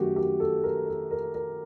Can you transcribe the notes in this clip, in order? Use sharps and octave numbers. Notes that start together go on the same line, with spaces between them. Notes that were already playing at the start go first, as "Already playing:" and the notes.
Already playing: F#2 D#3 F#3 A3 F#4 G4
G4
A4
A#4
A4
A#4
A#4